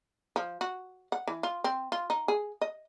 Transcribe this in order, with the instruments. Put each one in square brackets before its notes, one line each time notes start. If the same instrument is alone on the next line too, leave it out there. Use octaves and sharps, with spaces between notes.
[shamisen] F3
F#4
F#5
E3
F4
C4
F4
D#4
G#4
D#5